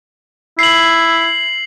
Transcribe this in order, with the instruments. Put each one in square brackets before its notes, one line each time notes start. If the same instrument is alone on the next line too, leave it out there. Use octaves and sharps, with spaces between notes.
[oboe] E4 [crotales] C7 F#7